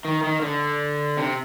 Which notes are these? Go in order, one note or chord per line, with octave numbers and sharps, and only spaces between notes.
D#3
D#3
D3
C3